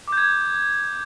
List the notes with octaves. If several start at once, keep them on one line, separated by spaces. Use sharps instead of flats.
D6 G6 G#6